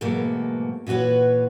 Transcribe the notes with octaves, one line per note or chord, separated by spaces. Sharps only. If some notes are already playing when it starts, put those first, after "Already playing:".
G#2 B2 E3 F#3 A3 A#3
A#2 E3 F#4 B4 C#5